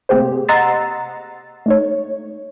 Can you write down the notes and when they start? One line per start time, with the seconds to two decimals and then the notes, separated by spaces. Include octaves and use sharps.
0.09 C3 A3 A#3 G4 G#4 C5
0.49 D#5 F#5 A#5 C6 E6 A6
1.66 A3 D#4 C#5